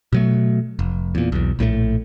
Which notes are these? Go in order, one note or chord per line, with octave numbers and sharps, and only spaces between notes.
B2 F#3 A3
F1
E2 A#2
B1 E2
A#1 A2 E3 A3